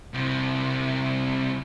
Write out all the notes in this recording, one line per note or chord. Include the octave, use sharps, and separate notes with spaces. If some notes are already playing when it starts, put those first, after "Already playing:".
C2 C3